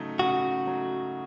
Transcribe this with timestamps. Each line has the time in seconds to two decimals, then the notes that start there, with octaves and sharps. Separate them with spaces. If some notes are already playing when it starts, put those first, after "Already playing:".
Already playing: C#3 F#3 A3 D#4
0.19 C#3 F#4
0.66 F#3 A3 D#4